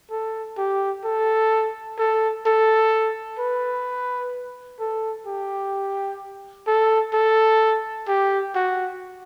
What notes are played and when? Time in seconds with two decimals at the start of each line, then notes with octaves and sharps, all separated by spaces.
0.11 A4
0.58 G4
1.04 A4
1.98 A4
2.46 A4
3.39 B4
4.79 A4
5.26 G4
6.67 A4
7.13 A4
8.08 G4
8.55 F#4